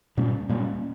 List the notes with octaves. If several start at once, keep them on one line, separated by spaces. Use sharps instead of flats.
A#2 G3 A#3 C#4
A#2 G3 A#3 C#4